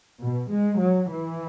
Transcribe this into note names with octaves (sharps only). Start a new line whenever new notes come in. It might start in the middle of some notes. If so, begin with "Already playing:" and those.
B2
G#3
F#3
E3